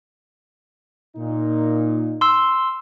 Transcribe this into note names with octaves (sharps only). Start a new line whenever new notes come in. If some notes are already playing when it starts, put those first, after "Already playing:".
A#2 D#4
C6 E6